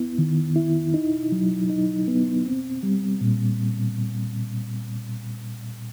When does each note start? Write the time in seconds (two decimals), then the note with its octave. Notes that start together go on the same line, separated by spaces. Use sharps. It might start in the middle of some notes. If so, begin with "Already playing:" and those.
Already playing: B3 E4
0.18 D#3
0.56 E4
0.94 D#4
1.32 F#3
1.70 D#4
2.08 B3
2.46 C4
2.83 G3
3.21 A#2